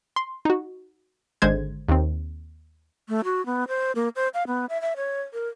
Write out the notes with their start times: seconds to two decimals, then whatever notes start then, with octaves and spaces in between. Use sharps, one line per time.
0.16 C6
0.45 D#4 F#4
1.42 G#1 D3 G#3 C5 G#6
1.88 D#2 C4
3.09 A3
3.25 F#4
3.46 B3
3.68 C5
3.95 A#3
4.16 C5
4.34 F5
4.47 B3
4.69 E5
4.81 E5
4.97 C#5
5.33 A#4